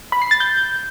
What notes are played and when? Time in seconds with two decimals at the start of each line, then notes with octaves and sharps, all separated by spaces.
0.12 B5
0.22 C7
0.31 A6
0.40 G6